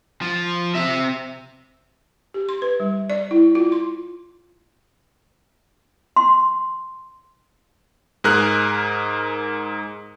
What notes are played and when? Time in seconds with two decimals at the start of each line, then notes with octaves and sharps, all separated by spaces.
0.21 F3
0.75 C4 E5
2.34 G4
2.49 C6
2.62 B4
2.80 G3
3.10 D5
3.31 E4
3.55 F4
3.72 C6
6.16 C6
8.24 G#2 G#4 A#4 F#6